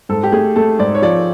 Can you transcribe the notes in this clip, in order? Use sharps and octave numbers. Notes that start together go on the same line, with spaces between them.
G#2 A4
G4
A3 G#4
A3 A4
G#2 D5
C#5
F3 D5